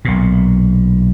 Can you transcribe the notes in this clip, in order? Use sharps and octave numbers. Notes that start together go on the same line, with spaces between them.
B1 A#2